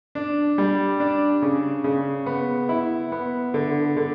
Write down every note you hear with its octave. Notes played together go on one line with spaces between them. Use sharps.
D4
G3
D4
C#3
C#3
B3
E4
B3
D3
D3